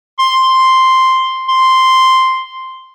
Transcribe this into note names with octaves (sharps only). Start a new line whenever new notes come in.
C6
C6